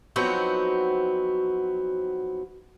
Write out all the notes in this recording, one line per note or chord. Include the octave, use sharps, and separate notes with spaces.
F3 F#3 B3 C4 D#4 F#4